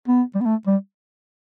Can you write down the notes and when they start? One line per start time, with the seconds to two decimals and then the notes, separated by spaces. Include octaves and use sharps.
0.08 B3
0.35 G3
0.41 B3
0.45 A3
0.67 G3